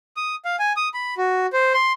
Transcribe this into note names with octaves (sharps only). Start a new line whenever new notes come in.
D#6
F5
G#5
D#6
B5
F#4
C5
C6